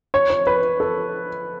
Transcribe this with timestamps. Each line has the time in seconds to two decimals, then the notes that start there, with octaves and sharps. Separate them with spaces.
0.14 C#5
0.30 C#5
0.47 B4
0.80 A4